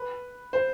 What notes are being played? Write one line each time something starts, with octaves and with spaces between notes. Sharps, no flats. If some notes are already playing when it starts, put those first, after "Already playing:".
Already playing: B4
C5